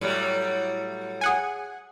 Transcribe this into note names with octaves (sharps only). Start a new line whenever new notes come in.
A2 F#3 G3
G#4 F#5 G#5